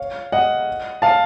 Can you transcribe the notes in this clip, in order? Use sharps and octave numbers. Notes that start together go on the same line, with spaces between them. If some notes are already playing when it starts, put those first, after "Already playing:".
Already playing: C#5 F5
D#5 F#5
F5 A5